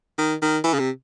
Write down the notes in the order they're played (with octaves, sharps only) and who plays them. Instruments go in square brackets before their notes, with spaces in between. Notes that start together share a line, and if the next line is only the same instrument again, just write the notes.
[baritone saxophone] D#3
D#3
E3
C#3
C3